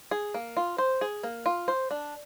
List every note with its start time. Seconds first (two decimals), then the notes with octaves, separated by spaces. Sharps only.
0.11 G#4
0.34 A#3
0.57 F4
0.78 C5
1.01 G#4
1.23 A#3
1.46 F4
1.68 C5
1.91 D4